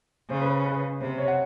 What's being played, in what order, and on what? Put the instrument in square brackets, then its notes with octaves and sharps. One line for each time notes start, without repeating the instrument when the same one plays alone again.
[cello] C#3 [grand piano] C5
[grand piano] B4
B4
[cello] C3 [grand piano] C5
[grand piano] C#5
F#5